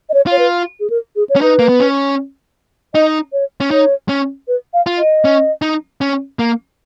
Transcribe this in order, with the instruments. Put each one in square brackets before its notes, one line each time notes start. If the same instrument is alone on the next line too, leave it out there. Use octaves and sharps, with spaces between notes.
[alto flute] D#5
C#5
[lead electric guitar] F4 [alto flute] C#5
[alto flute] B4
G#4
A#4
G#4
C#5
[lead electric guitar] C#4
[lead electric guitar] D#4 [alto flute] B4
[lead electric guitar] A#3
B3
C#4
[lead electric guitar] D#4 [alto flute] D#5
[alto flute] C#5
[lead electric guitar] C#4
[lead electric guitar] D#4 [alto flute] C#5
[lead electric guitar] C#4
[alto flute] B4
F5
[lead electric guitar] F4
[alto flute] D#5
[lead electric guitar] C#4
D#4
C#4
A#3